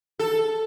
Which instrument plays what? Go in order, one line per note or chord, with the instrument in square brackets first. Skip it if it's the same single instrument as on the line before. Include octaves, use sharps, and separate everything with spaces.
[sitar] A4